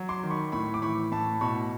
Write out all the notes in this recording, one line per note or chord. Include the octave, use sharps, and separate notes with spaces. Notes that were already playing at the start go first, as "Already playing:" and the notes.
Already playing: F#3
C6 D6
D#3
B5 C#6
A2 B5 C#6
D6
E3 B5 C#6
A2 A5 B5
B2 B5 C#6